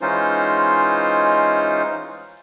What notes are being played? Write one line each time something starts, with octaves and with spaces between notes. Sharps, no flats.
E3 G#3 C#4 D#4 F4 C5